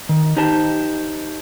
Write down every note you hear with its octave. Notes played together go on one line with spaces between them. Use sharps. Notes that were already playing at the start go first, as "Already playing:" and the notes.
D#3
D#4 G4 C5 A5